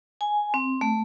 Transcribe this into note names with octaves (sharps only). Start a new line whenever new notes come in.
G#5
C4
A3